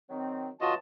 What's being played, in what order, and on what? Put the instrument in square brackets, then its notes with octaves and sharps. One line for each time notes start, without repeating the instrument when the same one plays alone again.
[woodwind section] D#3 F#3 C4
[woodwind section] C#3 E3 A5 [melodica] F4 F#4 D#5